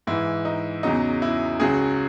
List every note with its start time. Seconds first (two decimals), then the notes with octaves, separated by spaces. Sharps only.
0.07 G#2 E3 E4
0.45 D#4
0.83 E2 C#3 F#3 D#4
1.22 E4
1.60 C#2 C#3 F#3 G#4